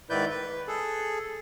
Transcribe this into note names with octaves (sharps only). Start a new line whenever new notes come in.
G#2 D#3 E4 B4 D5 G6
B4
G#4 A4